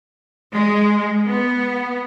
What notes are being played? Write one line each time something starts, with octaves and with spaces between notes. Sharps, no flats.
G#3
B3